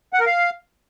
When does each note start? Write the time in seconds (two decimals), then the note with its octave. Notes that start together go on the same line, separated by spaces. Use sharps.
0.13 F#5
0.20 A#4
0.26 F5